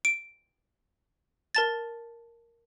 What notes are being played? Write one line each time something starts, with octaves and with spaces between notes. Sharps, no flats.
D7
A#4 A5 A6